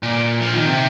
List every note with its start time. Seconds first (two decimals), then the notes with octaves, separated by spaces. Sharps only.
0.03 A#2
0.41 F3
0.53 D#3
0.66 C3